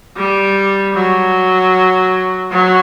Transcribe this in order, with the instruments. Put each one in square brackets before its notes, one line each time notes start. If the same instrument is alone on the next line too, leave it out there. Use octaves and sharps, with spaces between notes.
[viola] G3
F#3
F#3